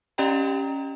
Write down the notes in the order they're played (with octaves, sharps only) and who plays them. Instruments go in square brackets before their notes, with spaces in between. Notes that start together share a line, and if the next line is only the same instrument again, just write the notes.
[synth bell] C#4 G4 D5 D#5 G5 A#5